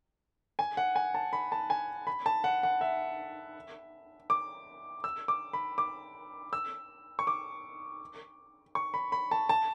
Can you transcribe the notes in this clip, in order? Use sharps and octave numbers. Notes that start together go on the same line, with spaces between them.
G#5
F#5
G#5
A5
B5
A5
G#5
B5
A5
F#5
F#5
E5
D6
E6
D6
B5
D6
E6
C#6
D6
C#6
B5
B5
A5
A5